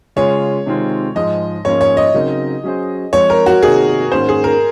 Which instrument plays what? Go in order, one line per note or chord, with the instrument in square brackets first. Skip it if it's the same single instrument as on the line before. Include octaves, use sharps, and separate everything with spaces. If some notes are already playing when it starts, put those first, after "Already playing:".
[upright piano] C#3 G#3 C#4 F4 G#4 [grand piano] C#5
[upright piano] C3 D#3 G#3 C4 F4
[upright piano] G#2 F3 G#3 [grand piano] D#5
[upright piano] G#2 F3 A#3 C#4 F4 [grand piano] C#5
[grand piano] C#5
D#5
[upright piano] C#3 F#3 C4 D#4 A#4
F#3 C#4 G#4 C5
[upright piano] F3 G#3 C4 [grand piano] C#5
[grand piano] A#4
F#4
[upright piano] C3 D#3 A#3 D#4 F#4 [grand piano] G#4
[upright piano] G#2 D#3 A#3 C#4 F#4 [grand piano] C5
[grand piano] G#4
A#4